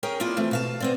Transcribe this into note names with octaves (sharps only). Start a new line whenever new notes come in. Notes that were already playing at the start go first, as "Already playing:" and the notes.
C#4 G#4 A#4 G5
A#3 D4 E4 F4
E3 A3 C4
B2 F5 A5
B3 C4 D5